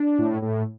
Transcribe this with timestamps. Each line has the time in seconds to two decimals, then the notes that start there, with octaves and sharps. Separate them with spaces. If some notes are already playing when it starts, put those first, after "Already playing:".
Already playing: D4
0.18 A2
0.42 A2